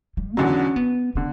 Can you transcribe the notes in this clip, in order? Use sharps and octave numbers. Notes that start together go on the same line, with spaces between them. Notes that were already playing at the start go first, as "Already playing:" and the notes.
G3
E2 D3 F#3 C#4
B3
D3 B3